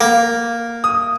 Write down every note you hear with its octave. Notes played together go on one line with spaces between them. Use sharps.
A#3
D#6